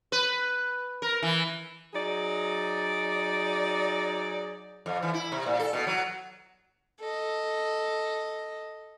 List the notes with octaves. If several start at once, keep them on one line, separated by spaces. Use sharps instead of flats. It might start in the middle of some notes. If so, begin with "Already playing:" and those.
B4
A#4
E3
F#3 D#4 G#4 D5
F2
E3
E4
C3
A#2
A4
B2
F#3
A4 D#5